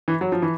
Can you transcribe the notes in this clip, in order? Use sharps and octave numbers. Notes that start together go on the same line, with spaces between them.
E3
F#3
F3
E3